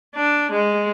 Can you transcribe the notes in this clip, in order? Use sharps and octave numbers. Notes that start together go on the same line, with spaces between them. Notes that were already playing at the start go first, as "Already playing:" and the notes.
D4
G#3